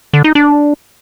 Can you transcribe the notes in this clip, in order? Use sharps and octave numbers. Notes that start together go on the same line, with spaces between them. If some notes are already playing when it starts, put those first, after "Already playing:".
D3
D#4
D4